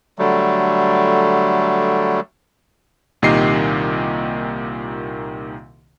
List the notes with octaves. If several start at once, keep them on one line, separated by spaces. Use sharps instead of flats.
D3 F#3 G3 A3
C2 A#2 D#3 G4 D#5 C7